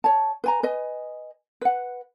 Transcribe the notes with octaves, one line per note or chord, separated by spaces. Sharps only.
C#5 A5
B4 G#5 A#5
B4 D#5 G#5
B4 F#5